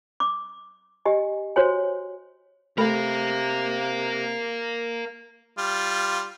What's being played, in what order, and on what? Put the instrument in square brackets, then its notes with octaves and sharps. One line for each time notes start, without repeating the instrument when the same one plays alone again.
[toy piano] D6
G4 D#5 G#5
F#4 C5 C#5 G#5
[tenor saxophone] C3 [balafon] A3 A4 B5 [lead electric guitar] A#4 F5
[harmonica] G3 F4